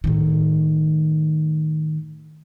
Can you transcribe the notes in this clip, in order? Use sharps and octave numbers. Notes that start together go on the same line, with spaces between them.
A2 D#3